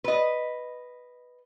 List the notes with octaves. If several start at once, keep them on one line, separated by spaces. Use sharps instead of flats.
B4 D#5